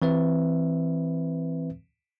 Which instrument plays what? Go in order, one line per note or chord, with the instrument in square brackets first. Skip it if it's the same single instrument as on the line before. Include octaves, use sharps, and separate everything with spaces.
[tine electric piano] E3 C4 B4 E5